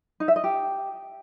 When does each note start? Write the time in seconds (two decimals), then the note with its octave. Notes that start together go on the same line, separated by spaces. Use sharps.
0.20 D#4
0.28 E5
0.36 D#5
0.44 G4